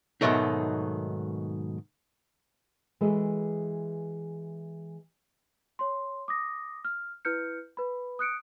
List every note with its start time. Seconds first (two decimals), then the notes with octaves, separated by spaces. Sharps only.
0.21 G#2 B2 D#3 F#3 A3 D#4
3.01 E3 G#3 F#4 G#4 A4 B4
5.79 C#5 C6
6.28 D6 D#6 A#6
6.85 F6
7.25 E4 B4 F6 G6 C#7
7.77 B4 B5
8.19 D#6 F#6 C#7 D7